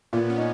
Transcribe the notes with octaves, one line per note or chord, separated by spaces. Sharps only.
A#2 B3
C#4
D#4